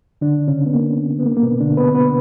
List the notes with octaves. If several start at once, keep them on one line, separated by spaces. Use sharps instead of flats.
D3 D4
C#3 C#4
B3
A#3
B3
A#3
A#3
B2 B3
D3 D4
B3 B4
B3 B4